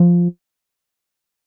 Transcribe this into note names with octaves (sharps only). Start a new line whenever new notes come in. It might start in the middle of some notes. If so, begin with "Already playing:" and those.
Already playing: F3